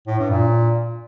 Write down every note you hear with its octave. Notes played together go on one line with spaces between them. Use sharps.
A2
G2
A#2